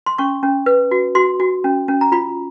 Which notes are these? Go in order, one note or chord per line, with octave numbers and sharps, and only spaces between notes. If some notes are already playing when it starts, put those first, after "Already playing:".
C6
C#4 C#6
C#4
B4
F#4
F#4 C6
F#4
C#4
C#4
A#5
F4 B5